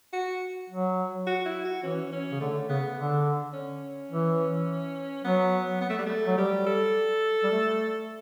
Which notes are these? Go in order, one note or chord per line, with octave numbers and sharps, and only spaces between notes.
F#4
F#3
F#4
E4
F#4
E3 C#4
C#4
C#3
D3 A3
C#3 B3
D3
C#4
E3
F#3 B3
B3
A3
G3
A3
F#3
G3 G4
A4
G3
A3